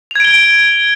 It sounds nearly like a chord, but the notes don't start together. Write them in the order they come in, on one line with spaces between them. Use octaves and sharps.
F7 G#6 D7 G7